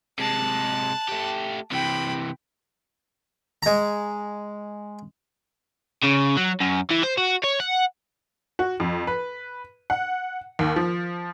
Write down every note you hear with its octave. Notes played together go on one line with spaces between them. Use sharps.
C3 G#3 A5 F#6
A3 G4
C3 E3 G5 B5
G#3 A#5
C#3
F#3
F#2
E3
C5
F#4
C#5
F#5
F#4
F2
B4
F#5
D#2
F3